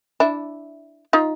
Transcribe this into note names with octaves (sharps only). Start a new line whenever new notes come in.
D4 E4
D#4 F4